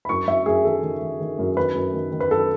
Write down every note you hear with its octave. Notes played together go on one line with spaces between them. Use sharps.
B5
F#2 C#6
F#2 E5
F#2 G#4
D#3 A4
D#3
D#3
D#3
F#2
D#3 B4
F#2
D#3
D#3
B4
F#2 A4